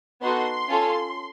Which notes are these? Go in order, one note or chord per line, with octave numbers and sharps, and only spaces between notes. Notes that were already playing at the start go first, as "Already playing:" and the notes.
B3 D#4 F#4 A4 C6
C#4 F4 A4